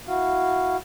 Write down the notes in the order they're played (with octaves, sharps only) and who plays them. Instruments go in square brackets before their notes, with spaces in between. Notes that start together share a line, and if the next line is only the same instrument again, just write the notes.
[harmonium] E4 F#4 F5